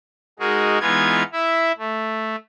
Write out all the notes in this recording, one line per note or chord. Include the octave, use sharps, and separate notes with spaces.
G#3 D#4 F#4 G#4 A#4
E3 G#3 B3 D#4 F4 G#6
E4 E5
A3